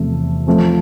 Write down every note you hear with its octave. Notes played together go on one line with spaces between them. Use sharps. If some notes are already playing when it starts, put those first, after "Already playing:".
Already playing: E2 C3 F3 A3
F3 A3 C4